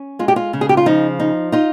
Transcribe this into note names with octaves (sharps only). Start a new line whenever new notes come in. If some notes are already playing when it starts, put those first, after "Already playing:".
Already playing: C#4
G#3 F4
G4
F4
C#3
G#4
G4
F4
F3 D#4
D#4
D#4 F4